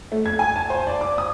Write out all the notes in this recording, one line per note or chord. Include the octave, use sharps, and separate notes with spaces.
A3
G#6
G#5
A5
C5
D5
D6
D#6